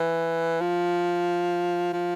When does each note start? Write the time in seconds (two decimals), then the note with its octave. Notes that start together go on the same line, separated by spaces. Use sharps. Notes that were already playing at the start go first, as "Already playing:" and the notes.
Already playing: E3
0.61 F3
1.93 F3